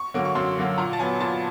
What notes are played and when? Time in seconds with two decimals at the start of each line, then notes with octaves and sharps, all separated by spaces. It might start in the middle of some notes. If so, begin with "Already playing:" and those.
Already playing: C#6
0.14 D3 F#3 A#3
0.25 C#6
0.35 F#2 C6
0.57 D3 F#3 A#3
0.78 A#2 A#5
0.93 A5
0.99 F#3 B3 G#5
1.20 A#2 A5